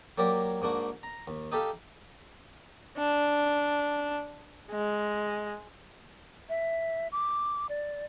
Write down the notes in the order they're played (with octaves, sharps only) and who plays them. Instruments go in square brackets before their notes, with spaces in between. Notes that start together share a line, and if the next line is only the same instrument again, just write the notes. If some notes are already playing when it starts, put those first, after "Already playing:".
[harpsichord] F#3 A#3 G4 A#4 D5
G#2 A#3 D4 F#4
A#5
D#2
D#4 G4 A4 E5 F5
[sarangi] D4
G#3
[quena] E5
D6
D5